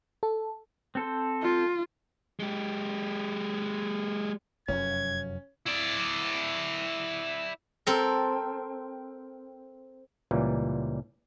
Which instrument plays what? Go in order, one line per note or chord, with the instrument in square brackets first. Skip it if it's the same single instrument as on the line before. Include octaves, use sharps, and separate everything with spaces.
[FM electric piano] A4
[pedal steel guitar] C4 A4 C5
[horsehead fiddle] F4
[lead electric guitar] G#3 G4
[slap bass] F1 F#2 F#3 [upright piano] C#4 [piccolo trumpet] G#6
[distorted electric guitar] E4 D5
[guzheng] C4 A4 A#4
[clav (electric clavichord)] C#2 A#2 E3 G3